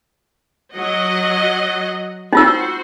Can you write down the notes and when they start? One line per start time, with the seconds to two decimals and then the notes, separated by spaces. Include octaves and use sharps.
0.75 F#3 D#5 F#5
2.33 D#4 F4 F#4 C5 E6